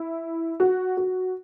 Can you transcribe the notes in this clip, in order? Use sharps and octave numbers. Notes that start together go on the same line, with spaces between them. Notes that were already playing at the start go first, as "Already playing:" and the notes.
Already playing: E4
F#4
F#4